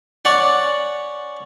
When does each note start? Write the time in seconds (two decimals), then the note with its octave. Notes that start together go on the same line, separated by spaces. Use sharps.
0.25 C#4 D5 F#5